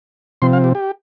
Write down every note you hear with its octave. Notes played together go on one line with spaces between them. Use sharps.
C3 F3 C4 C6
F5
G4
G4